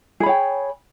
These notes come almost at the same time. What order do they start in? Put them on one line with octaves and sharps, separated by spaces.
G#4 B5 C#5 G5